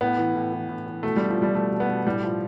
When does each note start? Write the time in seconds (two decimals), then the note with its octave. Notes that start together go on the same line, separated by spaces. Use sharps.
0.01 A2 B3
0.18 E3
0.35 A2
0.52 E3
0.69 A2
0.86 E3
1.03 B2 A3
1.16 B2 G3
1.30 F3
1.38 B2 G3
1.55 B2 A3
1.72 B2
1.80 B3
1.89 B2
2.06 A2 G3
2.23 F3